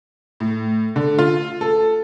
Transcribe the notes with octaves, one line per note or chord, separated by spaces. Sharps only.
A2
D3
F4
A4